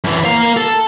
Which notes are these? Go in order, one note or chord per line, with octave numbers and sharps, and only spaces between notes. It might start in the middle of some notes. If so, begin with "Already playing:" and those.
F#2 E3
A#3 F5
A4